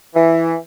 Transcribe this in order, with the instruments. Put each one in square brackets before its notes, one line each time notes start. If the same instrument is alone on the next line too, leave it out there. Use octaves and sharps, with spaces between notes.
[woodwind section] E3